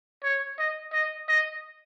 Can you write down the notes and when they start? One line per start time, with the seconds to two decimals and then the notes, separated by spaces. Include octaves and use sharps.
0.24 C#5
0.59 D#5
0.93 D#5
1.29 D#5